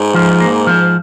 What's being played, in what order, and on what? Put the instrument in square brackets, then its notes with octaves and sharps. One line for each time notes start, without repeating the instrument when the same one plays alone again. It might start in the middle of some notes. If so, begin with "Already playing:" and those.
Already playing: [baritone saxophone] G#2
[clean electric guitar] F3
A#3
F3